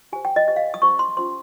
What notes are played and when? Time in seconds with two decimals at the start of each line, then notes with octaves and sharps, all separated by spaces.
0.13 G4 C5 G#5
0.25 G5
0.36 D#5
0.47 G4 C5 D#5
0.56 F5
0.74 D#6
0.82 C#4 G4 C5 C#6
0.99 C6
1.17 C#4 F4 C5 C6